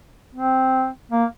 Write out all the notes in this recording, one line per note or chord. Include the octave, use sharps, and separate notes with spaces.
C4
A#3